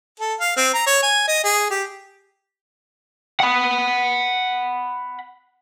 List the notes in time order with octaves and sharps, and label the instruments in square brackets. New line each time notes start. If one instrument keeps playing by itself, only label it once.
[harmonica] A4
F5
C4
A#5
C#5
G#5
D#5
G#4
G4
[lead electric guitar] F#5 B5